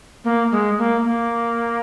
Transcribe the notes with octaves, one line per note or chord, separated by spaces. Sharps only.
A#3
G#3
A#3
A#3